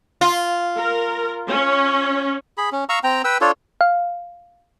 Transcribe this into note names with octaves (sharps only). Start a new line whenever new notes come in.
F4
A#4
C#4
G#4 B5
C#4
F5 A#5 C#6 E6
C4 G5 A#5
B4 G5 E6
D4 F4 A4 C#5
F5